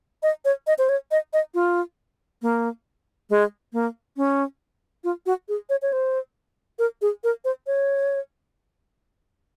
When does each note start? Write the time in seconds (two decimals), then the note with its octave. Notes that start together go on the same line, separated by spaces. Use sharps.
0.23 D#5
0.45 C#5
0.67 D#5
0.78 C5
0.89 C#5
1.11 D#5
1.33 D#5
1.54 F4
2.42 A#3
3.30 G#3
3.73 A#3
4.17 C#4
5.04 F4
5.26 F#4
5.48 G#4
5.69 C#5
5.82 C#5
5.92 C5
6.79 A#4
7.02 G#4
7.24 A#4
7.44 C5
7.67 C#5